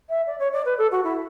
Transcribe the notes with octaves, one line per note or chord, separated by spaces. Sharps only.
E5
D5
C#5
D5
B4
A4
F#4
E4